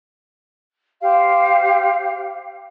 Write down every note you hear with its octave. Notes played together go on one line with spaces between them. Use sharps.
G4 C5 F5